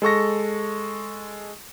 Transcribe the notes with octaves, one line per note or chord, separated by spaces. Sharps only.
G#3 A4 C#6 A#6